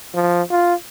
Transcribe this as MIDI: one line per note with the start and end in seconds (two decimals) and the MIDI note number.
0.15 0.42 53
0.51 0.74 65